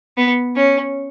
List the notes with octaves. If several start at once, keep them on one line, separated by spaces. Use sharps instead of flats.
B3
C#4